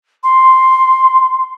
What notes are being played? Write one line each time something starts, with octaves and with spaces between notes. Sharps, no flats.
C6